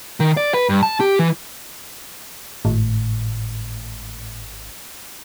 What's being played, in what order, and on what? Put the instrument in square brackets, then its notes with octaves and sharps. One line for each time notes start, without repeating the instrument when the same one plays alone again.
[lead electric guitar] D#3
D5
B4
G2
A5
G4
E3
[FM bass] G#1 [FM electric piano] A2